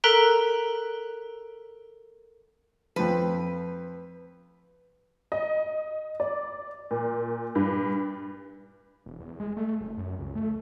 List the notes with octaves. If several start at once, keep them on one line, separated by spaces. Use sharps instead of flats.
A4 A#4 A#5 F#6 B6 D7
F2 F3 B4
D#5
D5
A#2
G2
E1
E2
G#3
A3
F#1
F#2
C#2
A3